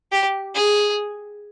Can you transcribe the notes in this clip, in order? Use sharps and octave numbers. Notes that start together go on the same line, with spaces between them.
G4
G#4